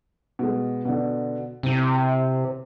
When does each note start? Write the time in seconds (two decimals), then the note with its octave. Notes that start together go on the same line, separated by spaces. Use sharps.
0.39 B2 G#3
0.85 B2 D3
1.63 C3 C4 E4 D#7